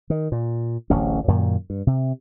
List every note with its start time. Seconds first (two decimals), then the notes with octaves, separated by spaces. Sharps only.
0.10 D#3
0.32 A#2
0.90 D1 A1 C#4
1.28 F#2 A#2 D#3
1.70 G2
1.87 C3